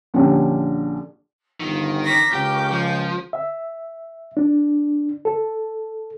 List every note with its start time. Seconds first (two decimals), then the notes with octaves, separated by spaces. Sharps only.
0.14 A#1 D3 C#4 G4
1.60 G1 D#3 F4
2.04 A#4 C#6 D6 A#6 B6
2.33 C#2 G4 G6
2.71 F3
3.33 E5
4.37 D4
5.25 A4